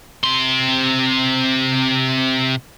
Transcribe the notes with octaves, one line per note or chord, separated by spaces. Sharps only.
C3 C6